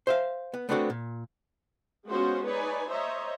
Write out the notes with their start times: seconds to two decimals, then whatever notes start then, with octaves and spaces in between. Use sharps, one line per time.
0.07 C5 E5 F5
0.54 B3
0.69 A3 B3 C4 D4 F#4 A4
0.90 A#2
2.07 G#3 B3 C#4 F4 F#4 C5
2.45 D#4 B4 C#5 D5 G#5
2.89 C5 C#5 D#5 E5 A#5